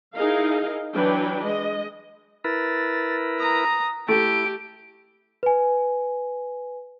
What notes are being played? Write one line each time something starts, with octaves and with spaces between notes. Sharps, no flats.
D#4 E4 G#4 A#4 D#5 F5
E3 F#3 D4 B4 G5
G#3 D#5
E4 A#4 B4 A6
A#5 D#6
A3 E4 G4 D7
B4 G#5